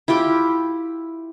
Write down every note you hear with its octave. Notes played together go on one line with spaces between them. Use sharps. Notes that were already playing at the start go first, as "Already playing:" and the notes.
E4 F4 G4 G5